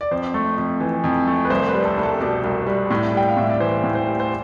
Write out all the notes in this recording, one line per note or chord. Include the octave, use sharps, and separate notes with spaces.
D5
F2 C5
A3
F2
E3
F2
A3
B4
C2 C5
B4
G3
A4
C2
A4
B2 D5
C2
G3
A2
G3 G5
F5
A2 E5
D5
E3 C5
A2
C5
G3
C5